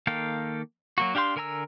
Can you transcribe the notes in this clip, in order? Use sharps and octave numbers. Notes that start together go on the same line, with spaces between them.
D#3 A#3 A4 F5 G5
F#3 A#3 F#4
D4 G4 F5 G5 C6
D3 A#4 G#5 A#5 E6